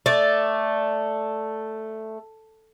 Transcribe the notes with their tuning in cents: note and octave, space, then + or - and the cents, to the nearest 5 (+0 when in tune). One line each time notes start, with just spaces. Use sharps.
A3 +0 D5 +0